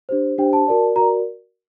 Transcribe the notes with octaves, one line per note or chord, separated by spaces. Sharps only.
D4 G4 C5
D4 G4 C5 G5
A5
F#4 A#4 D5
F#4 A#4 D5 A#5